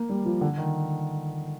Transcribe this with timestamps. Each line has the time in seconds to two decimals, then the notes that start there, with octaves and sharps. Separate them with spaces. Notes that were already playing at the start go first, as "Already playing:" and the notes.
Already playing: A#3
0.09 G3
0.25 F3
0.41 D3
0.57 D#3